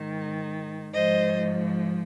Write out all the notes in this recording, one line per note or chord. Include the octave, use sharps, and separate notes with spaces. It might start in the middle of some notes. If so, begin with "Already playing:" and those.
Already playing: G#2 D#3
G#2 F3 C5 D#5